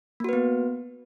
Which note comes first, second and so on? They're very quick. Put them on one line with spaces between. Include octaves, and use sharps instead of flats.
A#3 F#4 B4 B3